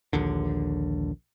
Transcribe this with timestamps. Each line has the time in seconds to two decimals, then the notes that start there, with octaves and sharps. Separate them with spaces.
0.13 A#1 D#2 D3